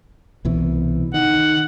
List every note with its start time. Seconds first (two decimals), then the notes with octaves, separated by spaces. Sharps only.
0.45 C2 B2 E3
1.14 D#3 F#5